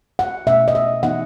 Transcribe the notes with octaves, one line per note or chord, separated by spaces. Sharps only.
F#5
B2 A3 C#4 E5
D#5
E5
E3 B3 D#4 F#5